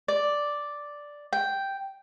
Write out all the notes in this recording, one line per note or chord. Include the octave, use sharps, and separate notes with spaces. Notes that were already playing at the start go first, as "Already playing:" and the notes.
D5
G5